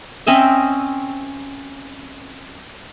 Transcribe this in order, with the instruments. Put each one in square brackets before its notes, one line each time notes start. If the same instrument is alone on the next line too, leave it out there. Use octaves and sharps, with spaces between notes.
[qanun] C4 C#4 D#5 E5